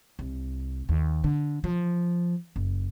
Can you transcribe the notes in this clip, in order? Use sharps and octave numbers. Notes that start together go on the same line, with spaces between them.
C2
D#2
D3
F3
F#1